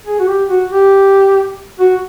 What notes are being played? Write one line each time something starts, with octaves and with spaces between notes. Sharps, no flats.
G#4
F#4
G4
F#4
G4
F#4